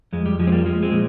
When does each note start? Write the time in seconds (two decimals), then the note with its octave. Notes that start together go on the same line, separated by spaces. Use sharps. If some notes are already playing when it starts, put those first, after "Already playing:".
0.13 F2 G#3
0.26 G3
0.39 F3 G#3
0.47 C4
0.52 G3 A#3
0.66 F3 G#3
0.83 G#3 C4
0.92 A#2